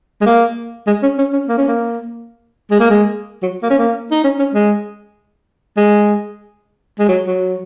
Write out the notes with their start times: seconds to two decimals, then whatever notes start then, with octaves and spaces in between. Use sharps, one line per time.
0.21 G#3
0.26 A#3
0.87 G#3
1.03 C#4
1.18 C#4
1.33 C#4
1.49 A#3
1.58 C#4
1.68 A#3
2.71 G#3
2.80 A#3
2.90 G#3
3.43 F#3
3.63 A#3
3.70 C#4
3.79 A#3
4.11 D#4
4.24 C#4
4.39 C#4
4.54 G#3
5.77 G#3
6.99 G#3
7.08 F#3
7.27 F#3